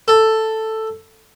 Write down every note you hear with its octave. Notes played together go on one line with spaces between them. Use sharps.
A4